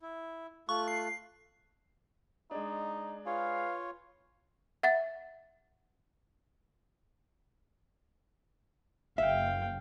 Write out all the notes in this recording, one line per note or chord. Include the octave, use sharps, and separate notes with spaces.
E4
A3 F4 C#6 F#6
C7
G#3 D4 D#4
F4 G#4 B4 C#5 F5
E5 F#5 A6
F#1 E5 F5 G5